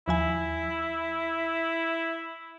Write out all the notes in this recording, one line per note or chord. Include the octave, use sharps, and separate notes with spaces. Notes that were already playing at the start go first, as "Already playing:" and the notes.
D#2 F3 E4 G#5